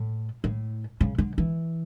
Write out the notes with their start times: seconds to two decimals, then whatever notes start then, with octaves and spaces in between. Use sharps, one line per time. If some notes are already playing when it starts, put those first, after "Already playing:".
Already playing: A2
0.44 A2
1.01 C#3
1.18 D3
1.38 E3